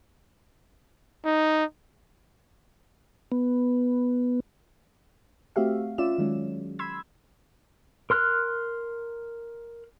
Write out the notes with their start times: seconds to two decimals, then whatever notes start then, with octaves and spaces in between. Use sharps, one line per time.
1.25 D#4
3.32 B3
5.56 A3 C4 F#4 G4 E5 F5
5.98 C#4 F4 D5 E5 E7
6.18 D#3 F#3 G#3 C#4
6.79 B5 C6 E6 G#6
8.10 A#4 C6 F6 F#6